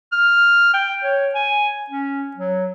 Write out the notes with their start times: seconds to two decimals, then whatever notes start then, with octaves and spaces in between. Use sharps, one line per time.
0.13 F6
0.74 G5
1.03 C#5
1.34 G#5
1.90 C#4
2.36 F#3